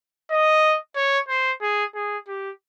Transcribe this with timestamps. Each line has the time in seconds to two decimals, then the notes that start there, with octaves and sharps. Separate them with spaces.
0.31 D#5
0.96 C#5
1.28 C5
1.62 G#4
1.95 G#4
2.28 G4